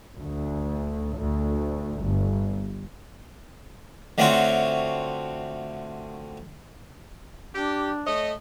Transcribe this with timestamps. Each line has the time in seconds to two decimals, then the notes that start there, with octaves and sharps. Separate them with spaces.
0.18 D2
1.18 D2
2.01 G1
4.18 D3 A3 C4 F4 F#4 C#5
7.54 D4 G4
8.06 A3 C#5 D#5